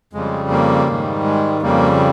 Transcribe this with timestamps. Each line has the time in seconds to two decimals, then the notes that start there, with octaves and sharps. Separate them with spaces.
0.13 F2 C#3 G3 G#3
0.51 A#3
0.87 G#2 D#3 G3
1.24 G#3
1.62 F2 C#3 G3 A#3